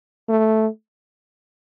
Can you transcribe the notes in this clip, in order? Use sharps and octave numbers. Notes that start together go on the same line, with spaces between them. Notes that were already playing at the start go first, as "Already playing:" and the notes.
A3